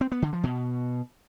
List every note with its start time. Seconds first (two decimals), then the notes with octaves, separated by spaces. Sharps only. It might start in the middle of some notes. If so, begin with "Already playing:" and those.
0.01 C4
0.12 B3
0.22 D3
0.33 F3
0.43 B2